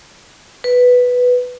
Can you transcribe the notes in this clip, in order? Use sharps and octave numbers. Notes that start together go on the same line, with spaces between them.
B4